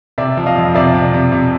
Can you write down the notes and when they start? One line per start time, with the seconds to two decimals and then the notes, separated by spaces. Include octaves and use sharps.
0.18 C3 D5 E5
0.37 F3
0.46 D#5 F5
0.56 F2
0.74 C3 D5 E5
0.94 C3
1.14 C3
1.32 C3